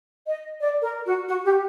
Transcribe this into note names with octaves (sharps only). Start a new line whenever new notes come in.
D#5
D5
A#4
F#4
F#4
G4